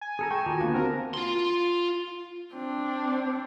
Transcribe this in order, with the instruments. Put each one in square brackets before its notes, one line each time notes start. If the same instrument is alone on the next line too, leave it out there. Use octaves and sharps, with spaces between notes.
[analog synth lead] G#5
[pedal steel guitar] G#4 A4 A#5
[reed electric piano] G5 [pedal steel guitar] A5 C#6
[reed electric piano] D#2 [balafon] F4 F#4 [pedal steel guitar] A#5
[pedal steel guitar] D3 B3 A5 [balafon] A#3 F5
[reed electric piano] C4 F#4 [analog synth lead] A#4
[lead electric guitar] F4 C6
[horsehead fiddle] C4 D4